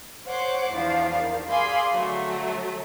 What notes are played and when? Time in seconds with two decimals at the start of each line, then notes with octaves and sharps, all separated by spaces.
0.26 C5 C#5 F#5 C6 D6 F#6
0.70 E2 F3 D4 F5
1.18 D#3
1.49 G#4 D5 F5 G#5 B5 C6
1.91 D3 F#3 A3